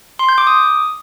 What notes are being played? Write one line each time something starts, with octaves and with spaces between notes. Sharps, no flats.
C6
G6
D6
D#6